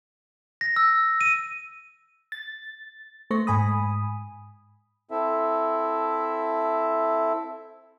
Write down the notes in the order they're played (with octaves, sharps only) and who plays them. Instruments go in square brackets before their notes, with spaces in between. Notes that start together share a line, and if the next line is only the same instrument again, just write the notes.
[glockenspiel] A#6
E6
D#7
[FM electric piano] A6
A3 C5 C#6 A#6
G#2 G#5 B5 D#6
[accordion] C4 E4 A4 E5